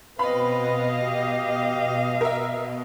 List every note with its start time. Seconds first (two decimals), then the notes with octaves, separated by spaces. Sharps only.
0.19 B2 C4 B4 D#5 F5 B5
1.04 G4
2.21 A#4 E5